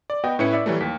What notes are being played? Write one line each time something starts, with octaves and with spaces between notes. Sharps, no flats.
D5
B3 F#4 D#5 G5
A2 C#4 E4 B4 C#7
D5 E5
E3 F#3 G3 A3
D#2 B6